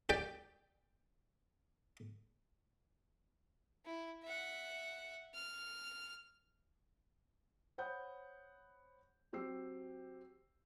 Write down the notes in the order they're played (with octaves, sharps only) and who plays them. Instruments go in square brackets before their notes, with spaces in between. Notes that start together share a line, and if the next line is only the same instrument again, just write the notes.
[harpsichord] G4 D5 G5
[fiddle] E4
E5 F#5
F6
[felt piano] C5 C#5 F#5 B5 D#6 G6
F#3 C4 G4 E6 C7